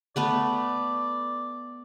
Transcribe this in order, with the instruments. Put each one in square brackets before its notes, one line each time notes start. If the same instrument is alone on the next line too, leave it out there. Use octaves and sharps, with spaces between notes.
[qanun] A3 B3 B4 [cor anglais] D5